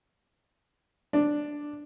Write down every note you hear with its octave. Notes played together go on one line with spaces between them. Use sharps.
D4